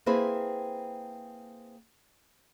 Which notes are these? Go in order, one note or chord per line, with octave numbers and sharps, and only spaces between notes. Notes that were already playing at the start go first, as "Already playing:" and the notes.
A#3 C4 E4 G#4 B4 C5